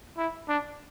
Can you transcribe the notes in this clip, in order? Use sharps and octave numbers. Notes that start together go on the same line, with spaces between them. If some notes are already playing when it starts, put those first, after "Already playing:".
E4
D4